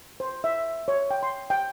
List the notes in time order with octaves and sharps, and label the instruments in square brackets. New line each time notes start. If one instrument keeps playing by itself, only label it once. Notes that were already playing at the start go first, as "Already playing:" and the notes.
[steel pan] C5
E5
C#5
G5
C6
G5